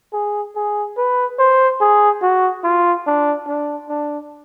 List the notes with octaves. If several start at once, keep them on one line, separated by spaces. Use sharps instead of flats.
G#4
G#4
B4
C5
G#4
F#4
F4
D4
D4
D4